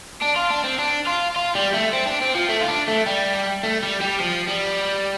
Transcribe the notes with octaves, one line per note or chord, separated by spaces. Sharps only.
D4
F4
D4
C4
D4
F4
F4
G3
A3
C4
D4
C4
F3
A3
F4
D4
A3
G3
A3
G3
G3
F3
G3